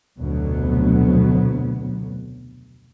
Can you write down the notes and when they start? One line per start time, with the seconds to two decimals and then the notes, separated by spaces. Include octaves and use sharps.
0.19 F1 D2 B2 F#3 B3